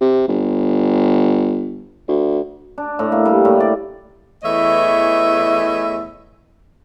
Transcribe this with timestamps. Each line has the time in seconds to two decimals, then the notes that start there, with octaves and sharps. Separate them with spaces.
0.01 C3
0.28 G1
2.08 D2
2.78 D4
2.99 A2
3.12 A#3
3.25 G3
3.45 A2
3.60 D5
4.43 E2 E3 A3 C#5 D#5 E5